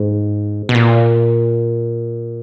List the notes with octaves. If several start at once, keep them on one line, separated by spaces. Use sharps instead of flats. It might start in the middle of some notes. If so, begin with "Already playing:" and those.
Already playing: G#2
B2
A#2